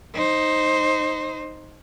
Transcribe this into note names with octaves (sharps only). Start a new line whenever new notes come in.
D#4 C5